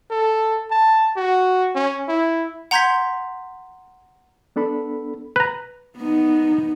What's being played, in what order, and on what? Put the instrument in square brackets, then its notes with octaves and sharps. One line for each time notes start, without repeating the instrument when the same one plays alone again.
[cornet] A4
A5
F#4
C#4
E4
[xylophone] F#5 A#5 C6 G6 G#6 B6
[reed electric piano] B3 D4 A4 B5
[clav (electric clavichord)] B4 A#5
[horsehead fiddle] B3 D#4